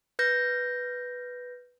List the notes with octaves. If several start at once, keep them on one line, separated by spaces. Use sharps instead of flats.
B4 G6 A#6